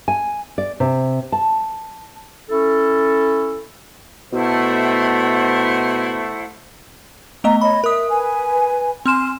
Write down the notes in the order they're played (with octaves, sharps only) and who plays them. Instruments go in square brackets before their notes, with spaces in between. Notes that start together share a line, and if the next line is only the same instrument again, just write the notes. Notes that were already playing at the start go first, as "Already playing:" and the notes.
[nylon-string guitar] G#5
D5
C3
A5
[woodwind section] C#4 E4 A4
[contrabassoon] B2 [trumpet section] A3 [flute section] E4 C5 F#5
[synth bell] A3 B3 D#5 [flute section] A#5
[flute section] C#5 D#5 [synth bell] B5
[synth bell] A#4 D#6 [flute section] E5
[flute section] B4 G#5
[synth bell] C4 F6 E7 [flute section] G#5 C6